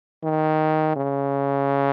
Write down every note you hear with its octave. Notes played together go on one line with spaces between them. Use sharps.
D#3
C#3